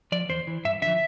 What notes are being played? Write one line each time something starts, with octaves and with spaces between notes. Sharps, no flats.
F3 D5
E2 C5
E3
G2 E5
D3 F3 E5